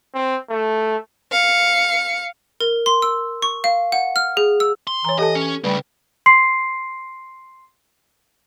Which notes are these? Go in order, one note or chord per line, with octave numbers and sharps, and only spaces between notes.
C4
A3
F5 C#7
A#4
C6
E6
C#6
F5
F#5
F6
G#4
E6
C6
E3 C#5 A#5
G4 A4 D#5 A5
C#4
C#3 G3 A3 B4 G5
C6 C7